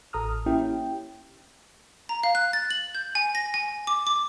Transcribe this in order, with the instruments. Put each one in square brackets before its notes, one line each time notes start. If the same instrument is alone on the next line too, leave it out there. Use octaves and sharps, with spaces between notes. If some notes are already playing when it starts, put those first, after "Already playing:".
[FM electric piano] A1 A4 A#5 D#6 F6
A#3 C#4 E4 G4 G5
[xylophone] A#5
F5
F#6
A6
F#7
G6
G#5
A#6
G#5
D6
D6